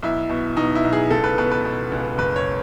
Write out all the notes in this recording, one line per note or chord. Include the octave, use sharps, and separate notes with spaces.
B1 E4
B2
B2 D#4
E4
B1
G#4
C#2 A4
B4
B2 B4
B4
B2
C#2
F#1 B4
C#5